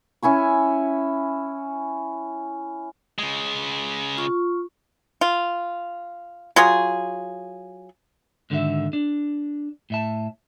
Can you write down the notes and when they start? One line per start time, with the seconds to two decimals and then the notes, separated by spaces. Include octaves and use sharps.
0.23 C#4 E4 G#5 C#6
3.19 C#3 G#3
4.17 F4 C#6
5.21 F4
6.56 F#3 F4 G#4
8.50 G#2 D3 D#3 F#4 A4 E5
8.93 D4
9.90 A2 E5 A5